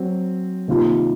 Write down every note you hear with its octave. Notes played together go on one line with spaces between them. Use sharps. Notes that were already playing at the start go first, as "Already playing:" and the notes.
Already playing: F#3 C4
C3 D#3 A#3 F4